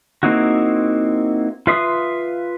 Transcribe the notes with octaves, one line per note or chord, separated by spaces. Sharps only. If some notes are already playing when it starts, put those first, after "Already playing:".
A#3 C4 D#4 E4 F#4
F4 B4 E5 C6 D#6